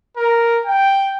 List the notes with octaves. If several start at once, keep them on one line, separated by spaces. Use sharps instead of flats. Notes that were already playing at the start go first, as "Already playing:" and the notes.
A#4
G5